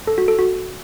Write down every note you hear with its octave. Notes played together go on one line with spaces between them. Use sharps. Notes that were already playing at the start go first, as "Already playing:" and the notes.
A4
F#4
A4
F#4